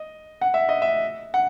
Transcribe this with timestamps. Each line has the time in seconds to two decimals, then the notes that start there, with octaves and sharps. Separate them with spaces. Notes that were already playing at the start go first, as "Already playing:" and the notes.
Already playing: D#5
0.41 F#5
0.54 E5
0.69 D#5
0.82 E5
1.34 F#5